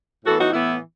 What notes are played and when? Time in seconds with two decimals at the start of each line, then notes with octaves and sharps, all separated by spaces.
0.25 A2 E3 B3 F#4 A4
0.40 D#4 F#4
0.53 A2 E3 B3 E4